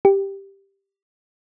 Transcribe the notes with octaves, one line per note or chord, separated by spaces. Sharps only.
G4